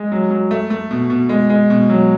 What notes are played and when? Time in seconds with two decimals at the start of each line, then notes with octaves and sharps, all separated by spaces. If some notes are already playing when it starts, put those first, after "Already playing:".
Already playing: G#3
0.12 F#3
0.30 F#3
0.51 A3
0.70 A3
0.91 B2
1.10 B2
1.29 G#3
1.50 G#3
1.70 B2
1.89 F#3